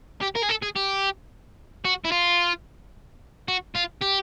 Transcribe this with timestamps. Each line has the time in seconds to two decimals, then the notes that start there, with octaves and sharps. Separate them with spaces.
0.21 G4
0.35 A#4
0.42 G#4
0.49 A4
0.62 G#4
0.76 G4
1.85 F#4
2.05 E4
2.11 F4
3.48 F#4
3.76 F4
4.02 G4